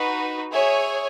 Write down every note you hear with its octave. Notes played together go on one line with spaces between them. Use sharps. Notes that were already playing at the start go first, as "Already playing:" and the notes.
Already playing: D#4 F#4 B4
G#4 C#5 E5 G#5